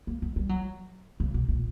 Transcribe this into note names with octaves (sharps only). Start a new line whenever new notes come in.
A#3
B3
G3
F#3
C#3
B2
A#2